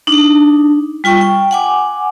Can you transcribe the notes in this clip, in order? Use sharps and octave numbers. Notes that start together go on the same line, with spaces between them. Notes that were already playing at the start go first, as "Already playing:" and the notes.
D4 D#4
G3 F4 G5 C#6
G5
F#5 G#5 D6